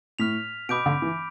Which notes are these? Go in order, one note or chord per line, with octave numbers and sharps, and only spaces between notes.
A2 F6 B6 F7
B2 B5 D6 G6 D7
D3
E3